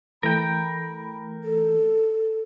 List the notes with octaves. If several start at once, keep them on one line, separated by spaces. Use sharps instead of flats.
E3 A3 A#4 G5 B5
A4